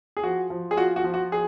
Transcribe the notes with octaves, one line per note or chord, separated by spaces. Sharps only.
G#4
F3 F#4
F3
G#4
F4 F#4
F#4
F3
F#4
G#4